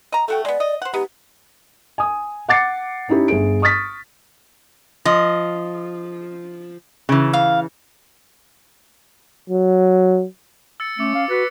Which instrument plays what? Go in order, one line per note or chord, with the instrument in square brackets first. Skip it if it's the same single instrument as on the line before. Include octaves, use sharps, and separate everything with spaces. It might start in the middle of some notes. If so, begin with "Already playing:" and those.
[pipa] D#5 A#5
[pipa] A3 F#4 G5 [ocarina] A4
[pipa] G#3 B3 [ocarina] D5
[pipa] D#5
C5 F#5
[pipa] G#3 B3 D#4 [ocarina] G4
[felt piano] G#5 D#6
F#5 D6 A6 C7 C#7
C#4 D#4 E4 G4
G1 G#4 D7
C#6 D#6 F6 A6 B6
[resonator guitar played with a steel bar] F3 [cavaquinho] D#5
[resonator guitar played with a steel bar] C#3 E3
[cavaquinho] F5
[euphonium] F#3
[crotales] E6 A6 C#7
[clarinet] A3 [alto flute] C#4 [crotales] D6 C#7
[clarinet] F5
[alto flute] F#4 [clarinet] B4 [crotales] A6 C#7